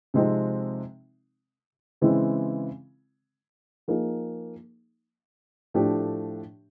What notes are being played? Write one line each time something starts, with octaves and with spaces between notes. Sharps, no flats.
C3 F3 G#3 C4 D#4
C#3 E3 G#3 C4 E4
F3 A#3 D#4 G#4
A2 F3 A3 D4 G4